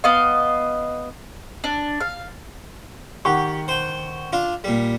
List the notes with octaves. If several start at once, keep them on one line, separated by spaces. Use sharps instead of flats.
B3 D#5 F5
D4
F5
D#3 G4 F#5 C#6
C5 G5
D4 F4
A#2 G3